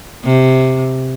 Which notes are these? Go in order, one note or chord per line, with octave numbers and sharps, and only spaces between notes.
C3